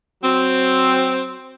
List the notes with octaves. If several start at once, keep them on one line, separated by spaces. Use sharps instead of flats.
F#3 C4